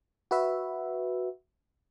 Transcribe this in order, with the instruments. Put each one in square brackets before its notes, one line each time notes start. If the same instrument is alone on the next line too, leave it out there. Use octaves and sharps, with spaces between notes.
[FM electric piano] F#4 B4 E5